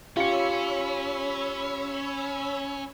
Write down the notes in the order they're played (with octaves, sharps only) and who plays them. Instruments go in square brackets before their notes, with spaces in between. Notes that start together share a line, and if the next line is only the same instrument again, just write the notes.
[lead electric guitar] C#4 [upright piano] F4 G4 C#7 [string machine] C#5 B5 E6